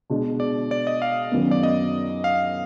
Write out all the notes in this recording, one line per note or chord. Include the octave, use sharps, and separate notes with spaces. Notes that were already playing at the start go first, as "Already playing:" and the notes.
B2 G#3 D4
D5
D5
D#5
F5
F#2 D#3 F#3 B3
D5
D#5
F5